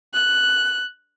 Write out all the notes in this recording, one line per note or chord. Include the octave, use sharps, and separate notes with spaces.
F#6